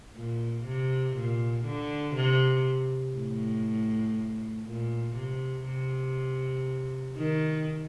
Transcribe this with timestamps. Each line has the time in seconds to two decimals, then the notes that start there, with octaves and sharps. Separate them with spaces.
0.16 A#2
0.66 C3
1.16 A#2
1.66 D3
2.16 C3
3.16 A2
4.66 A#2
5.16 C3
5.66 C3
7.17 D#3